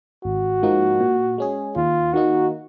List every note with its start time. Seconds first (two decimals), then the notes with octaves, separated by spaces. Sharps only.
0.24 G#1 F#4
0.63 G#2 F3 A#3 D#4
1.00 A#2
1.38 G#3 C#4 G#4
1.76 D#2 F4
2.13 D#3 A#3 D#4 F#4